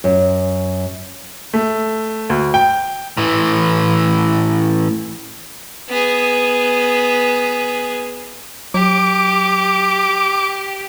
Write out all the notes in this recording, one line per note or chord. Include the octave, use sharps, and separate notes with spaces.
F#2
A3
D2
G5
A2 E3
B3 G#4
F#3 G4 D6